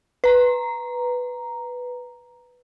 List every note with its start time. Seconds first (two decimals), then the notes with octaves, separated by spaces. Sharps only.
0.24 B4 A#5